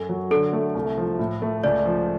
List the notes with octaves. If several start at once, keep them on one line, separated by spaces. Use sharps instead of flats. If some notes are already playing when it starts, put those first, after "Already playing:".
Already playing: F#2 A4
F#3
D3 A4
A3
C2
F3
A2
A3
C#2 D5
F3